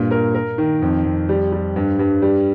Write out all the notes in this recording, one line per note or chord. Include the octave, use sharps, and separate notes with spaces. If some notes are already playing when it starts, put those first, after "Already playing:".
Already playing: G2 A#2
A#4
A#4
D#3
F2
F2
G3
G3
G2
G2
G3